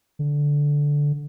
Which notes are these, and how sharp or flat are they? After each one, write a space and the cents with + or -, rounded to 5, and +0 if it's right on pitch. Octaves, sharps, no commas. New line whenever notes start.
D3 -10